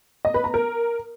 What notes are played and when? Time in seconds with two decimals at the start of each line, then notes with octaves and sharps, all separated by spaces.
0.25 D#5
0.34 B4
0.44 A#5
0.54 A#4